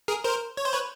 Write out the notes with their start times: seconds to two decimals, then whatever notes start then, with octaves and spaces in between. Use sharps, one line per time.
0.08 G#4 A#4
0.24 A#4 C5
0.57 C#5
0.65 C5
0.73 B4 C#5